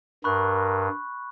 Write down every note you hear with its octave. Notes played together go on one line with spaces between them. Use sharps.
G2 A#4 B5 C#6 F#6